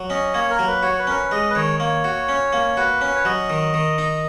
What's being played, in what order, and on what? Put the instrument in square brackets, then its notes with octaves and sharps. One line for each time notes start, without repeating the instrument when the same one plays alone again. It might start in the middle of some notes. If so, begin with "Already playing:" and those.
Already playing: [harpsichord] F#3
[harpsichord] C#4 [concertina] D#5
[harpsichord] A#3 [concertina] C#5
[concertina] A#4
[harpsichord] F#3
[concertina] B4
[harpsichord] F#4 [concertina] C#5
[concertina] B4
[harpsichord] C#4 [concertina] A#4
[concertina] B4
[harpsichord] G#3 [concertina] D#5
[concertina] B4
[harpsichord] D#3 [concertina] C#5
[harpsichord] A#3 [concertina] C#5
[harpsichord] F#4
C#4
A#3
[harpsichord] F#4 [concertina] B4
[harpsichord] C#4
[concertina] C#5
[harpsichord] F#3 [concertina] D#5
[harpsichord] D#3
D#3
D#4